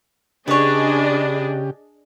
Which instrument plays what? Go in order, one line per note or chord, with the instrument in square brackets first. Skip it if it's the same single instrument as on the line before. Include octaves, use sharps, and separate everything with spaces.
[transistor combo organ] C#3 G4 [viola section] D4 G#4 D#5 [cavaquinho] B4 C#5